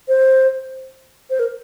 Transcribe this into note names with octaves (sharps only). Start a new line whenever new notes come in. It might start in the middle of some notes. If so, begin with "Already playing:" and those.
C5
C5
A#4